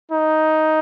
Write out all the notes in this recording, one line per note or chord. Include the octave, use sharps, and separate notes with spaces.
D#4